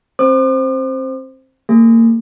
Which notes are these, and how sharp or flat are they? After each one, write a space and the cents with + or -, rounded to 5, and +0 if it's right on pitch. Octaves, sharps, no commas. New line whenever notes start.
C4 +30 C5 +0 D6 +45
A#3 -30 G#4 +0